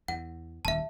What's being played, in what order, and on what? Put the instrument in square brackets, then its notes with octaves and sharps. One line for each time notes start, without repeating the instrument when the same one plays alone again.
[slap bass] E2 [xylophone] F#5
[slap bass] D#1 D#2 [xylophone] E5 A5